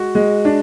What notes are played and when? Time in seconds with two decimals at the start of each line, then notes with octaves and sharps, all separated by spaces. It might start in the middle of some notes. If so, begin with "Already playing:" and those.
Already playing: G#3 F#4
0.15 G#3
0.45 D4